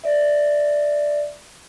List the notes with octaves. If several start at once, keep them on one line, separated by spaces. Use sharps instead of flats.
D5 E5